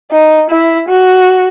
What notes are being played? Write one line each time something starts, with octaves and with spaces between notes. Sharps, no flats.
D#4
E4
F#4